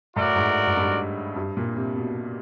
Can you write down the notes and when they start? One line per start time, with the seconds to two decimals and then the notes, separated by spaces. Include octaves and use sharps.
0.16 A2 F#4 A#4 D5
0.36 G#2
0.67 G#2
0.77 G2
1.36 G2
1.57 A#2
1.76 C3
1.96 B2